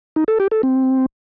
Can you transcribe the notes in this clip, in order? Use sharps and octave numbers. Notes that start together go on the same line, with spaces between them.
D#4
A4
G4
A4
C4